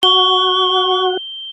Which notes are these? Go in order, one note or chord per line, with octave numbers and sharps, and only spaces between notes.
F#4 C#6 G7